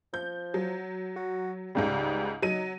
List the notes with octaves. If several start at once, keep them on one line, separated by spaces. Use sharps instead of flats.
F3 G6
F#3
F#4
C#2 G#2 C#3 G3
F#3 D#4 D#7